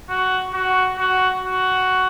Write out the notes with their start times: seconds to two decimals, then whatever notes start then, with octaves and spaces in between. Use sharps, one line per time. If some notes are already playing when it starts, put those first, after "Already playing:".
0.09 F#4
0.54 F#4
0.98 F#4
1.42 F#4